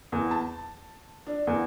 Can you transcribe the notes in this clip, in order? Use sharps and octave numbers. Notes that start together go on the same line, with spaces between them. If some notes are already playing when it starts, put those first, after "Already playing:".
E2
A5
D4
E2